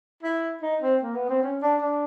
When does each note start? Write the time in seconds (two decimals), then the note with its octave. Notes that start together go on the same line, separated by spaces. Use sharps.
0.23 E4
0.62 D#4
0.82 C4
1.03 A#3
1.15 B3
1.29 C4
1.43 C#4
1.62 D4
1.82 D4